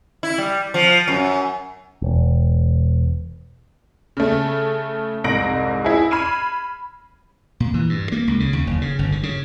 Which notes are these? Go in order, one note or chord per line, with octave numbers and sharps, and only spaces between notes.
E4
G3
F3
F#2
E1
C#3 A3
C2 F2 G#2 A#6 D7 F#7
E4 G#4
B5 F6 G#6 C7 D#7 E7
A#2
E3
G2
A#3
C#2
C#3
D#2
F#1
C#3
G1
D3
C#3